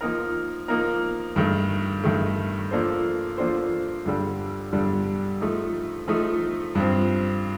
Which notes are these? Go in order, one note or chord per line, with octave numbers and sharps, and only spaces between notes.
F3 A#3 D#4 A#4
F3 A#3 D#4 A#4
G2 D#3 A3
G2 D#3 A3
F3 A#3 D4 A4 C5
F3 A#3 D4 A4 C5
G2 D3 G3
G2 D3 G3
F3 A3 D#4
F3 A3 D#4
G2 F3 C4